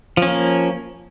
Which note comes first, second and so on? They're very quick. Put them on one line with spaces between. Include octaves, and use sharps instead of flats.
F3 C#4 A#3